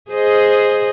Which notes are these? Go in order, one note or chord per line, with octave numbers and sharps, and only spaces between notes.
G#4 C5 D#5